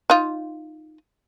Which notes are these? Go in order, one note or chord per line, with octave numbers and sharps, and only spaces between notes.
D#4 F4